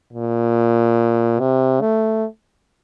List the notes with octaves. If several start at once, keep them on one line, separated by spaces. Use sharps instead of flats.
A#2
C3
A3